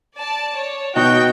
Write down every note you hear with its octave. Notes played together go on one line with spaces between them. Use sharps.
D5 A5
C#5
B2 D#4 F#4 G5 G6